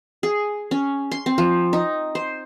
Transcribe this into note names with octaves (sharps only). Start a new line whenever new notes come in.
G#4
C#4
C6
C4
F3
D#4
C5